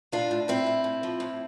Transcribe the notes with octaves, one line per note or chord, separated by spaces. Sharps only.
A2 D4 F4
A2
A2 C4 E4
A2
A2
F3
A2